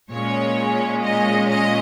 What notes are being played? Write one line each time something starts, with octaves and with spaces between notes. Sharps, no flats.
A#2 G#3 C#4 C#5
D#5
D#5